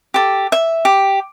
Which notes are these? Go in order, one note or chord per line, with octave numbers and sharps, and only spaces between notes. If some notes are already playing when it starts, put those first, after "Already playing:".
G4 A4
E5
G4